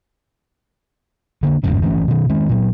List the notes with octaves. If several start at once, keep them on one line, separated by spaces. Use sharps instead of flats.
D3 A#3 D4
G1 E2 G#2 C#3
G1 E3 A3 C#4
B2 D#3
D#3 G#3 C#4
A#2 F#3